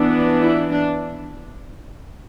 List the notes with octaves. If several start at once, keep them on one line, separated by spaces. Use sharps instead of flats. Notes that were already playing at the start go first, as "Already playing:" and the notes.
Already playing: E3 B3 D4
E4
D4